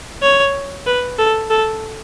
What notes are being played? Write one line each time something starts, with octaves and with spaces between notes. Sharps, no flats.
C#5
B4
A4
A4